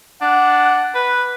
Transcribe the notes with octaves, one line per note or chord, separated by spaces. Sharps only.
D4 F#5
B4